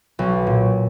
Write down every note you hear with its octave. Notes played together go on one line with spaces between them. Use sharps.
B1
A#2